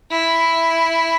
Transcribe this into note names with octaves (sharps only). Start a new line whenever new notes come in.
E4